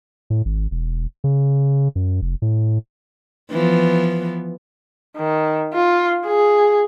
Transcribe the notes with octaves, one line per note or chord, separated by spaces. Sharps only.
A2
G#1
E1
C#3
F#2
F1
A2
E3 F3 B3
D#3
F4
G#4